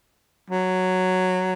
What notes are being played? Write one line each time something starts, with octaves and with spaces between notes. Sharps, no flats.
F#3